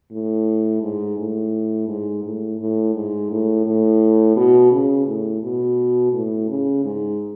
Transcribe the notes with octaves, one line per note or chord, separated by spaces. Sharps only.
A2
G#2
A2
G#2
A2
A2
G#2
A2
A2
B2
C#3
A2
B2
A2
C#3
G#2